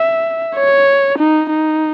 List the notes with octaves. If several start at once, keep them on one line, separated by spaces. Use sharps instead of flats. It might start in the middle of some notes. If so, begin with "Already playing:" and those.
Already playing: E5
C#5
D#4
D#4